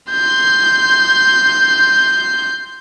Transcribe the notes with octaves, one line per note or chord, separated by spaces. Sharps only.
C6 G6